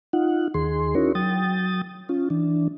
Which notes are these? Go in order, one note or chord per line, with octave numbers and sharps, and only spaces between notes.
D#4 F4 F#5
D#2 D#3 G#4 C6
C#4 D#4 E4 F#4 A#4 C#5
F#3 G5 D#6 A6
C#4 F4
E3 D4